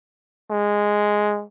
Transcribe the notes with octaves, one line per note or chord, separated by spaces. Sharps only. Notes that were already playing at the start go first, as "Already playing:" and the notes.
G#3